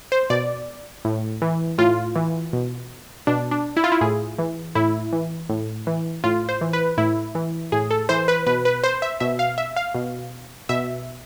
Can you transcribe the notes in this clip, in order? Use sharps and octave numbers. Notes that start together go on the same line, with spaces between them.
C5
B2 D5
A2
E3
A2 F4
E3
B2
B2 D4
D4
E4
F4
E4
A2 G#4
E3
A2 E4
E3
A2
E3
A2 F4
C5
E3
B4
A2 E4
E3
A2 G#4
A4
E3 C5
B4
B2 B4
B4
C5
E5
B2 E5
F5
E5
F5
B2
B2 E5